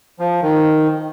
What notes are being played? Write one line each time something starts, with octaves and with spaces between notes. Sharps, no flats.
F3
D#3